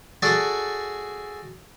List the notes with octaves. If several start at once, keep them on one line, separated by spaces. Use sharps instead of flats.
F#4 G#4 A4 D5